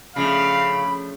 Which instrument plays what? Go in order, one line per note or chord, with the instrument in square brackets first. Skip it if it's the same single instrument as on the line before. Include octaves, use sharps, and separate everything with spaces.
[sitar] C#3 [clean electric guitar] F3 A3 D4 [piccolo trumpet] F5 [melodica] B5